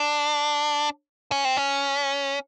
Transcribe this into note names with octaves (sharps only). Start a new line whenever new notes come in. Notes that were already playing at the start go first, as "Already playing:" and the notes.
Already playing: D4
C#4
C4
C#4